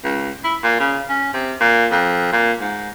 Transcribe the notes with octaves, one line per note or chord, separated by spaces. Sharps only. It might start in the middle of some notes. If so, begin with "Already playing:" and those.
C#2
E4
A#2
C#3
C#4
C3
A#2
F2
A#2
G#2